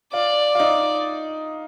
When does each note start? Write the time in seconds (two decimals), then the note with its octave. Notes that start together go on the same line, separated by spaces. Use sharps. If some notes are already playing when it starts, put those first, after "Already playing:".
0.13 F4 D5
0.55 F4
0.59 D#4